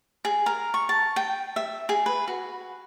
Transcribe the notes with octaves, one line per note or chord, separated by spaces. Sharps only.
G#4
A#4
C#6
A5
G5
E5
G#4
B4
F#4